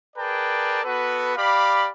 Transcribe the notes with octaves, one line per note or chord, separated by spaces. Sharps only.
G#4 A#4 B4 D5 G5 A5
B3 F#4 A4 B4
G4 D5 F5 B5